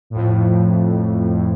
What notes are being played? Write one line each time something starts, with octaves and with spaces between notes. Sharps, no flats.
F2 A2